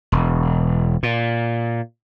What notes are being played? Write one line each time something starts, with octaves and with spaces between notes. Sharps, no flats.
E1
A#2